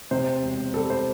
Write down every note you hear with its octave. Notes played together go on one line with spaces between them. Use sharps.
C3 C5
E1
G3 A4
C5